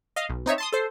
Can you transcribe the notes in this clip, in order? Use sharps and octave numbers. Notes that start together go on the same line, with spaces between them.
D#5 F5
B1
C4 D#4 C#5 E5
A5 C6 D#6
A4 C5